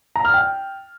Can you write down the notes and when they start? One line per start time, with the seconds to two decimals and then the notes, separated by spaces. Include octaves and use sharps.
0.16 A#5
0.25 F6
0.34 G5